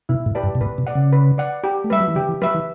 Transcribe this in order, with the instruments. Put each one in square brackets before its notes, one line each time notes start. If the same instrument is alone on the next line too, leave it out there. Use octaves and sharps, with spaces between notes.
[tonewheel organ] B2 [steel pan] E4
[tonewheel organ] A2
[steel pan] G4 B4 D5 A5
[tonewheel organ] G2
B2
[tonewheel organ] A2 [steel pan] B4
[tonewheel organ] B2
[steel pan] D5 F#5
[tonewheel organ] C#3
[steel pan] B4
D5 F#5
G4
[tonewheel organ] A3
[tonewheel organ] G3 [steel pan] B4 E5
[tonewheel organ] F#3
E3
[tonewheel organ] D3 [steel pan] G4
[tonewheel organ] E3
[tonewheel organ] F#3 [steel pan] B4 E5
[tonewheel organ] E3